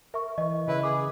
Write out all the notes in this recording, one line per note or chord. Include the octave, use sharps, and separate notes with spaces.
A#4 E5 C#6
E3 D#5
C#3 E4 B4
G#4 D6